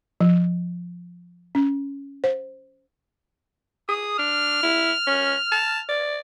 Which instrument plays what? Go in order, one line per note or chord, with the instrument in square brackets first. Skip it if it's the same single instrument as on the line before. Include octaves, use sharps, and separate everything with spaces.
[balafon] F3
C#4
C5
[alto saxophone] G#4 [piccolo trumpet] D#6
[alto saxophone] D4 [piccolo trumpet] F6
[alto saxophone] E4
C#4
A5
D5